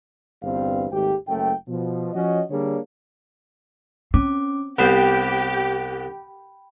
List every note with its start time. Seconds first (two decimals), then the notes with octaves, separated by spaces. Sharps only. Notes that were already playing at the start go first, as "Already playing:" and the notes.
0.43 G1 E2 G2 G3 C4 F5
0.91 G#1 D#2 G#2 A3 G4 G5
1.27 F#1 F#2 A3 G5
1.68 B2 F3
2.14 F3 C#4 F#4 C#5 D#5
2.50 D3 G3 A#3 D4 G#4 C#5
4.14 C4 C#4 D6
4.79 C2 B3 G4 C5 G5 B5